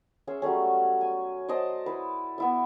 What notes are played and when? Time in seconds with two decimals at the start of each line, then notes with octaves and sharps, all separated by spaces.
0.27 C#4 G#4 E5 C6
0.42 F#3 G3 A3 C#4
1.01 G#5
1.49 C5 D5 D#5 A5
1.86 E4 B4
2.38 B3 E4 E5